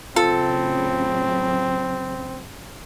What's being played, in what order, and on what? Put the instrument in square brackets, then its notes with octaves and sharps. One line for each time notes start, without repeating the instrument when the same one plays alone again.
[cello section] A2 C#3 F#3 [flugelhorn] C4 [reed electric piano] F4 [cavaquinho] A4